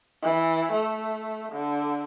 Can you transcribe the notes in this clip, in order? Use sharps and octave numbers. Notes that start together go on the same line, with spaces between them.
E3
A3
D3